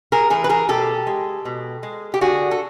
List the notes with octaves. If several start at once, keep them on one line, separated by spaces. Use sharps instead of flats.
G#4 A#4
E3 A3 G#4 A#4
B4
G#4 A#4
B2 G4 A4
G#3
B2
G#3
G4
D3 F#4 G#4
A4